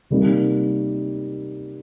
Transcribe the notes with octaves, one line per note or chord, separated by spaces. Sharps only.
C3 G3 A#3 D#4